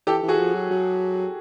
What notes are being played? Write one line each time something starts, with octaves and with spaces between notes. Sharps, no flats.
E3 G4 A4
E3
F#4 G#4
F3
F#3
F#3